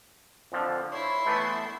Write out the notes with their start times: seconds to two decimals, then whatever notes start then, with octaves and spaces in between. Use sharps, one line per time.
0.52 F2 D3 F3
0.92 E4 C#5 C6
1.26 E3 A3 B3